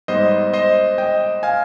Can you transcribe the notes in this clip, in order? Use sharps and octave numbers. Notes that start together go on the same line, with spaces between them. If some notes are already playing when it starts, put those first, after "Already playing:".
G#2 G3 B3 C5 D#5
C5 D#5
D#5 G5
F5 G#5